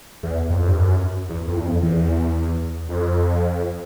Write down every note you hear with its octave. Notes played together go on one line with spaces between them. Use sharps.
E2
F2
G2
F#2
E2
F2
E2
F2
E2
F2